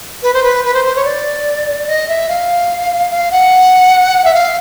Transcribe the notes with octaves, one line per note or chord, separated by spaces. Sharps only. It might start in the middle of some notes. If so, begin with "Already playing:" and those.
B4
C5
B4
B4
C5
C5
C#5
D5
D#5
E5
F5
F5
F#5
E5
F5